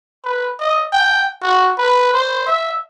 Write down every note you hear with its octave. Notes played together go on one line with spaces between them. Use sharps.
B4
D#5
G5
F#4
B4
C5
E5